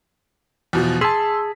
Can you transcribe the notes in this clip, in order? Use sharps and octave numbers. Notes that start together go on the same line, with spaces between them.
E2 B2 F3
G#4 A5 C6 E6 B6